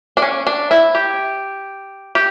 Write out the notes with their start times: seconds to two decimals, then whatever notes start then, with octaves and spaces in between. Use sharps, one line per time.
0.17 D4
0.22 C#4
0.47 D4
0.71 E4
0.95 G4
2.15 G4